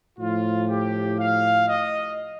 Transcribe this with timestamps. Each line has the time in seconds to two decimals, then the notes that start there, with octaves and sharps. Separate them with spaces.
0.18 A2 F3 F4
0.68 G4
1.18 F5
1.68 D#5